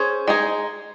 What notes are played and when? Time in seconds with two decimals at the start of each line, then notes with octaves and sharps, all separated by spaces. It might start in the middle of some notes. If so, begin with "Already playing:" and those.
Already playing: C#4 G#4 C5
0.28 G#3 D#4 G#4